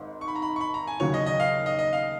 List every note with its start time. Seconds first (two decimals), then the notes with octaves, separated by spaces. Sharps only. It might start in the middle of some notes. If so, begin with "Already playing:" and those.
Already playing: G#1 G#2
0.21 C#6
0.28 B5
0.35 A#5
0.42 B5
0.56 C#6
0.61 B5
0.74 A#5
0.87 G#5
1.00 D#2 C#3 F#3 C#5
1.14 D#5
1.26 D#5
1.40 F5
1.66 D#5
1.79 D#5
1.93 F5